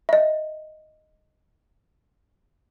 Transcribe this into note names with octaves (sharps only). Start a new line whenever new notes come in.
D#5 E5